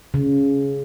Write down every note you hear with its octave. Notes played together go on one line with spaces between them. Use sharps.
C#3